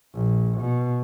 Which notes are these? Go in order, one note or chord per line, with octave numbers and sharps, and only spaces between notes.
A#1
B2